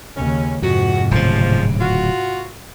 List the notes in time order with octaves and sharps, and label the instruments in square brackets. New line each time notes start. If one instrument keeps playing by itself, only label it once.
[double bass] D#2 C#3 [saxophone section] C#4
[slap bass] F2 [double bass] G#2 C3 [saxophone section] F#4
[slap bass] D1 C#3 [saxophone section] F3
[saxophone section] F4 F#4